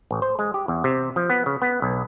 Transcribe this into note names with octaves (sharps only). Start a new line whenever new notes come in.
A1
C5
G#3
G4
E2
C3
F3
B3
C#3
B3
B1